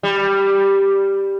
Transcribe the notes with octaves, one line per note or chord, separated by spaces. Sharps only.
G3